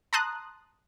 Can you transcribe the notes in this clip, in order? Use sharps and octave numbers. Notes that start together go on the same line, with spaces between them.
A5 A#5 C6 D#6 F#6